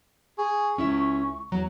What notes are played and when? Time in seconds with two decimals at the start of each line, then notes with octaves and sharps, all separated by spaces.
0.38 G#4 C#6
0.78 C#2 C#4 E4 E5
1.52 E2 F#3 A#5